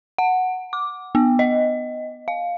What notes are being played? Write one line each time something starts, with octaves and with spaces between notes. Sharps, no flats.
F#5
D6
B3
D#5
F5